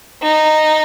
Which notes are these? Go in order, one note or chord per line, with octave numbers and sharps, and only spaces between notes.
D#4